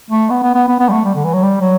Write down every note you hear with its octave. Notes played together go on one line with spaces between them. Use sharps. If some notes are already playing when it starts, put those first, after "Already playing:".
A3
B3
B3
B3
B3
B3
G3
A3
G3
D3
E3
F#3
G3
F#3